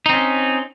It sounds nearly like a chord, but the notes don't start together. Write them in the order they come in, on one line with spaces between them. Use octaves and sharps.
D#4 C4 C#4